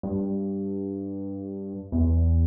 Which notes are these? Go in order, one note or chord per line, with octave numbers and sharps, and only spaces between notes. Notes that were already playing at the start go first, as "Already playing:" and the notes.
G2
E2